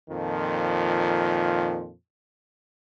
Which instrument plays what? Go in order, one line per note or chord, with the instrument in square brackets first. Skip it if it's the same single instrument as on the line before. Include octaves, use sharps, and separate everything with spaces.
[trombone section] F2 A#2 D#3 F3